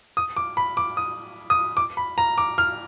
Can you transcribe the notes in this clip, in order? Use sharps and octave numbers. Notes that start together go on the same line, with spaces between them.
D#6
D6
B5
D6
D#6
D#6
D6
B5
A#5
D6
F6